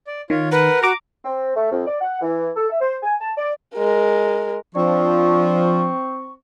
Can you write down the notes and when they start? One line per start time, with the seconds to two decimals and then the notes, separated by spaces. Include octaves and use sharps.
0.07 D5
0.30 D#3 F4 C#5
0.51 A#4 B4 F#5
0.83 F#4 A#5 D6
1.24 C4
1.56 A3
1.71 F2
1.86 D5
2.01 F#5
2.21 E3
2.56 A4
2.70 E5
2.81 C5
3.03 G#5
3.20 A5
3.36 D5
3.74 G#3 A#4
4.75 F3 C4 D4 C#6